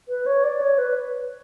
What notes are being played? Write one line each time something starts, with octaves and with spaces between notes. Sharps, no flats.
B4
C#5
D5
C#5
B4